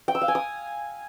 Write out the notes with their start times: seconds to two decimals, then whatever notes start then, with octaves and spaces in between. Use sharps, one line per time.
0.08 G5
0.15 E6
0.21 F5
0.28 G#5
0.35 D#6